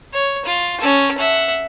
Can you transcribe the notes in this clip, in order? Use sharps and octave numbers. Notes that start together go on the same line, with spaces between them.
C#5
F4
C#4 A4
E5 F#5